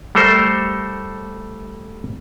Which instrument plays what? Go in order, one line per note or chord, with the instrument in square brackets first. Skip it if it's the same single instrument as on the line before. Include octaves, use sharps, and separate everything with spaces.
[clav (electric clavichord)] G3 A3 A4 A#4 C5